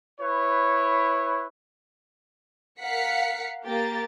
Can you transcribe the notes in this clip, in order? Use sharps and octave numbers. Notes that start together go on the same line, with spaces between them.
E4 B4 C#5
A#4 F5 F#5 B6 C#7
A#3 G4 A#5 A6